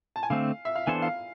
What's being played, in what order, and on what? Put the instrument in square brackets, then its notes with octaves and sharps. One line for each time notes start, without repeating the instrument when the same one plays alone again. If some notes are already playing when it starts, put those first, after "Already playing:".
[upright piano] A5
G#5
[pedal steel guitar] D3 A3 C4 [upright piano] F5
[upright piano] E5
F5
[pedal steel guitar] E3 B3 D4 A4 C5 [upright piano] G#5
[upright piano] F5